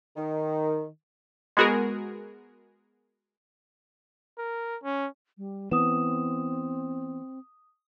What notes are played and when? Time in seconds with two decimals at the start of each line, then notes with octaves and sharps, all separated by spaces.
0.17 D#3
1.57 G#3 B3 F#4 G#4 A#4
4.39 A#4
4.84 C#4
5.38 G3
5.71 E3 B3 C4 D#6 E7